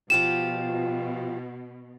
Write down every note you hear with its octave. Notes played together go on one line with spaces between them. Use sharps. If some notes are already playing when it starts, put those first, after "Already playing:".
B2 F3 F4 G4 E7